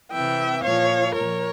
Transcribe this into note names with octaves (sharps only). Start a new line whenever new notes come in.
C3 E3 E5 G5
A#2 F3 C#5 F5
A#2 F3 A#4 C#5